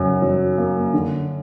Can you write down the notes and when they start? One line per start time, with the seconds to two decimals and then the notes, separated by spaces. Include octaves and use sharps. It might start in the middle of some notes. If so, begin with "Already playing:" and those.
Already playing: F#2 C#3
0.22 F#3
0.58 A#3
0.93 D3